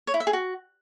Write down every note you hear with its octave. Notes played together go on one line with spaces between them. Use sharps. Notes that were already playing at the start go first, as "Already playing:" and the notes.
C#5
E4
E5
G#4
F#4